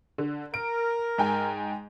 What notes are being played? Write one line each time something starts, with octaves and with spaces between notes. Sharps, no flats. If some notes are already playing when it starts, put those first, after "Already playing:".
D3
A#4 D7
G#2 G5 G#5